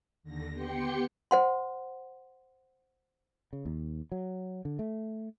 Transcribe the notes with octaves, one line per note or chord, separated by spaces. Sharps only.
D#2 D3 A#6
B3 G4 G5 C6 C#7
C5 F#5 C6
C#3
D#2
F#3
D3
A3